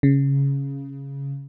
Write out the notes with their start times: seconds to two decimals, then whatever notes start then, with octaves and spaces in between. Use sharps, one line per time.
0.03 C#3